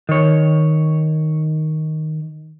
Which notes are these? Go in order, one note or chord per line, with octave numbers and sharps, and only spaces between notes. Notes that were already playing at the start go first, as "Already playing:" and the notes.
D#3 C#5